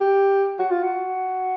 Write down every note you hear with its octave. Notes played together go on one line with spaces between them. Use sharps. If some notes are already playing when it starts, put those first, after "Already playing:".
G4
F#4
F4
F#4